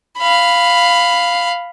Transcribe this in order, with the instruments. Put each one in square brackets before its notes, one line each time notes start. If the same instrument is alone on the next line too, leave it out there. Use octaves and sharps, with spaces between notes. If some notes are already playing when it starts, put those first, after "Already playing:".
[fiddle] F5 B5